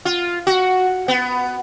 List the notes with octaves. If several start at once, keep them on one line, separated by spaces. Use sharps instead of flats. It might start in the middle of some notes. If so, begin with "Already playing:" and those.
F4
F#4
B3